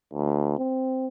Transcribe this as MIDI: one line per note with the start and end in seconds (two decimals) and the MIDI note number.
0.13 0.57 38
0.58 1.07 60